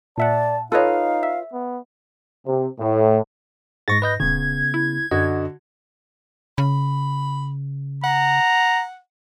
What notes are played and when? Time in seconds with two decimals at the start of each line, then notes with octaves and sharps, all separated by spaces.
0.18 A#2 D5 E5 F#5 A5
0.72 D#4 F4 A4 B4 C#5 D#5 F5
1.23 E5
1.53 B3
2.46 C3
2.79 A2
3.88 G#2 G#3 C#6 A6 A#6
4.02 B4 D#5 G6
4.20 D#1 C#3 B3 G#6
4.74 E4
5.11 F#2 D3 F#4 D#5
6.58 C#3 B5
8.04 F#5 A#5